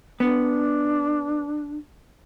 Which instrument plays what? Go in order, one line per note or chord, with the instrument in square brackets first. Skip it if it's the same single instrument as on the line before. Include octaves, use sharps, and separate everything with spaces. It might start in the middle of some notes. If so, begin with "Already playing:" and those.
[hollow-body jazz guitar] B3 [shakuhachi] D4